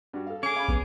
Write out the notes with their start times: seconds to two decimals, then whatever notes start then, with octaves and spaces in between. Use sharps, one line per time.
0.13 G2 F#4
0.27 A4 F5
0.43 C#4 G#4 D6
0.56 F5 B5
0.68 A#1 B3